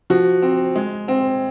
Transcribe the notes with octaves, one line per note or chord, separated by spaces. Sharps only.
F3 F#4
C4
G#3
C4